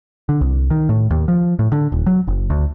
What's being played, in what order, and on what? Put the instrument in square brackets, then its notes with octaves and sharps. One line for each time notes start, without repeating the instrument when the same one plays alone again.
[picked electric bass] D3
C2
D#3
A2
D#2
F3
A2
D3
D#1
F#3
F#1
D2